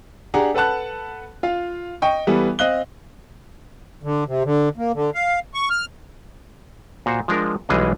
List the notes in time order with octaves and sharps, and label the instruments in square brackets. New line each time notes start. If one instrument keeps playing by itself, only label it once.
[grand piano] D4 G4 G#4 F#5 A#5
A4 B4 F#5 A5 F#6
F4 F5
D#5 G5 C#6
E3 G3 B3 A4
C4 D#5 F5 F#6 G7
[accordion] D3
C3
D3
A#3
D3
F5
C#6
F6
[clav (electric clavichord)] A#2 F#4 C5
F3 G#3 D4 A#4
B1 E3 G3 G#3 G#4 D#5